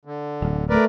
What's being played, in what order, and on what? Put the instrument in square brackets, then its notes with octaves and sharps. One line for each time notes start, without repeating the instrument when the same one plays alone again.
[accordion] D3
[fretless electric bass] D1
[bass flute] A3 [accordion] A#4 B4 D5